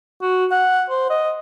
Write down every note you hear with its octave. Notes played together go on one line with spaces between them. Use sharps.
F#4
F#5
C5
D#5